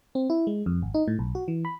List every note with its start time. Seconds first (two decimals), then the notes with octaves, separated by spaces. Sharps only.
0.15 C4
0.30 E4
0.47 G#3
0.66 F2
0.82 G#1
0.94 D#4
1.08 A2
1.19 B1
1.35 F#4
1.48 E3
1.65 B5